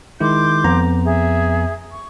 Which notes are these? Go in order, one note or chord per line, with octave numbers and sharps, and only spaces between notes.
D#3 G#3 E4 C6 D6 G6
F2 B3 A#5
G#4 E5
C#6